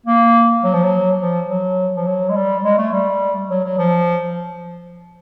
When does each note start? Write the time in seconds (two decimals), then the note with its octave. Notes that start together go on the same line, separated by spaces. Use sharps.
0.06 A#3
0.64 F#3
0.73 F3
0.83 F#3
1.21 F3
1.49 F#3
1.96 F3
2.07 F#3
2.29 G#3
2.35 G3
2.64 G#3
2.78 A3
2.92 G3
3.50 F#3
3.64 F#3
3.78 F3